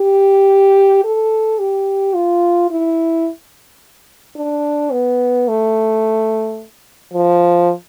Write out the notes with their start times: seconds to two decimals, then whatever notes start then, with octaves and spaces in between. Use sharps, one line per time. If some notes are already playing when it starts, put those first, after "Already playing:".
Already playing: G4
1.04 A4
1.59 G4
2.15 F4
2.71 E4
4.36 D4
4.92 B3
5.48 A3
7.14 F3